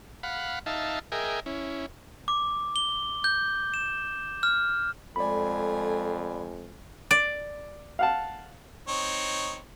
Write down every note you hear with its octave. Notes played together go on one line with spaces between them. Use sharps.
F5 F#5 B5
D#4 E5 F5 A5
G#4 A#4 D#5 E5 G5 G#5
C#4 E4
D6
G7
G6
E7
F6
F2 G#3 A3 A4 D5 G#5 B5
D5
F5 F#5 A5
C4 D#4 C#5